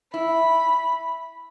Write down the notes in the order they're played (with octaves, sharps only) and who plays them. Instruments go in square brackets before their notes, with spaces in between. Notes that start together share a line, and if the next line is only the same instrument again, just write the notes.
[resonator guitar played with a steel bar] E4 [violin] B5